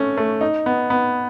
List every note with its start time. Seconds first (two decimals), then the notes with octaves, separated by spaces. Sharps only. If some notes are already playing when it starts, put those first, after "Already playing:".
Already playing: A3 C#4
0.17 A3
0.41 D#4
0.66 B3
0.90 B3